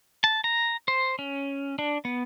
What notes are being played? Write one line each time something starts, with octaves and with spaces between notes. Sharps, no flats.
A5
A#5
C5
C#4
D4
B3